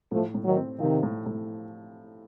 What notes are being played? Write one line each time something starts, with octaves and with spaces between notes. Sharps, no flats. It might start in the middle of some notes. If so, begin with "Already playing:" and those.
A2 F3 A3
A2
D#3 F#3
C4
C3 D#3 F3
A2
A2